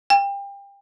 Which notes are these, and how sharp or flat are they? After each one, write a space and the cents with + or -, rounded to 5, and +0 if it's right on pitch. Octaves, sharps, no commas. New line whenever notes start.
G5 +30